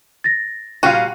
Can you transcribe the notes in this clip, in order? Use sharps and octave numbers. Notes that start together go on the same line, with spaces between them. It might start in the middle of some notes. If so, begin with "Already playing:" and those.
A6 A#6
A#2 G3 F4 F#4 F5 G5 D#7